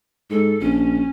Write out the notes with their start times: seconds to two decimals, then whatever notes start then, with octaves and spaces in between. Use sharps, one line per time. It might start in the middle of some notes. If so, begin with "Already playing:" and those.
0.30 G#2 A4
0.60 A#1 C#4